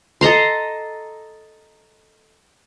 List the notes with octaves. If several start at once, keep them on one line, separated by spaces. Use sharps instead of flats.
A4 D#5 A#5 C6